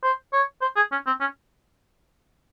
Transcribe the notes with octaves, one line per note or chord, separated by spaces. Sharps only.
C5
C#5
C5
G#4
C#4
C4
C#4